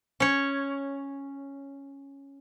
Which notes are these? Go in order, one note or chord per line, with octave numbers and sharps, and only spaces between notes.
C#4 C#5